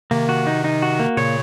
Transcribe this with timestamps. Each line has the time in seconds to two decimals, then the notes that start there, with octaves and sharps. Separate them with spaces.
0.11 C3 D#3 A#3
0.29 F#4
0.47 D#4
0.64 D#4
0.82 F#4
1.00 A#3
1.17 A#2 C#3 C#5